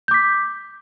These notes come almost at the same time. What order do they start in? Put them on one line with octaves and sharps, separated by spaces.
G6 D6 B6